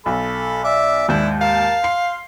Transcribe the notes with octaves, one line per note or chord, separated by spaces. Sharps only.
B1 A4 B5
D5 E5
D#2 G#2 D4 E4 G6
A#4 F5 A5
C6 C7